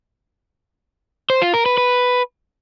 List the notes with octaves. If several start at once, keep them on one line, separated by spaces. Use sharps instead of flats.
C5
F4
A#4
B4
B4